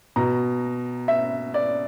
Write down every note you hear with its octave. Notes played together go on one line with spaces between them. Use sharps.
B2 A#5
E5
D5